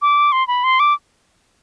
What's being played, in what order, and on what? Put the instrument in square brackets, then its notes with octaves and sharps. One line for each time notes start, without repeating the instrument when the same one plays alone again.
[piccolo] D6
C6
B5
C6
D6